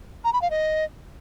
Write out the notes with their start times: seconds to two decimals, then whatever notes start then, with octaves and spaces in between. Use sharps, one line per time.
0.24 A#5
0.33 B5
0.42 F5
0.50 D#5